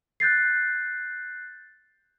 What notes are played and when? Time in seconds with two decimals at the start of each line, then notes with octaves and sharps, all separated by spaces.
0.20 F#6 G6 A6 C7